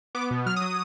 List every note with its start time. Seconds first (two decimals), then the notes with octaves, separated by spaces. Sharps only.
0.15 B3 D6
0.31 B2
0.46 F#3 F6
0.57 D#6
0.62 F#3